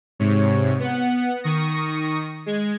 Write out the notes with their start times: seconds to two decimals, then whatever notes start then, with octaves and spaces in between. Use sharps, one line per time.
0.19 G#2 C3 C#5
0.80 B3 F#5
1.44 D#3 C#6 D#6 A#6
2.46 G#3 G#6